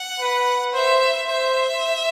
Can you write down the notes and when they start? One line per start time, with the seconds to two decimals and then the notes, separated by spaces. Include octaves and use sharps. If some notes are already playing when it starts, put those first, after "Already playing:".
Already playing: F#5
0.20 B4
0.73 C5 E5
1.28 C5 E5